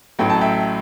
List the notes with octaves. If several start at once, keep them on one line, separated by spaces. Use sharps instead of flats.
A1 A2 F#3 G5
A5
E5 G5